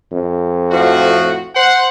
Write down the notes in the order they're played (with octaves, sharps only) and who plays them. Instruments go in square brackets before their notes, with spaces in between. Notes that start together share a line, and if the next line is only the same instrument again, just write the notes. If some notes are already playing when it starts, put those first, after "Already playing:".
[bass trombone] F2
[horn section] A2 F3 F#4
C5 F#5